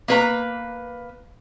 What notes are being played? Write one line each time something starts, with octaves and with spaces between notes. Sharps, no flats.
A#3 B4 A#5